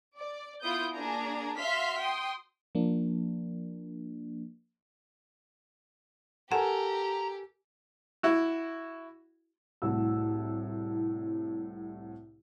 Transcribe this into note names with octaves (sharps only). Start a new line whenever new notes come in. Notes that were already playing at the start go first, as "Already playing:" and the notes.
D5
B3 E4 F4 D#6 G6
A#3 D4 G#4 G#5 A#5
F#4 E5 F5 C6 F6 B6
G5 C6 D#6
F3 A#3 D4
G4 A4 A#4 F#5 G#5 A#5
E4 F#4
C2 A2 F#4 E6